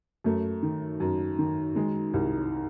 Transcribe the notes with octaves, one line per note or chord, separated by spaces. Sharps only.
F#2 A3
D#3
F#2
D#3
D#3 G#3
C2